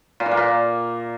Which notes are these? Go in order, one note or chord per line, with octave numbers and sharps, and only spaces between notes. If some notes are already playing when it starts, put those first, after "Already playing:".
A#2
E3
A#3
A#2